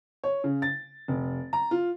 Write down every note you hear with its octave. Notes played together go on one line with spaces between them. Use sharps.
C#5
C#3
A6
F1
A#5
F4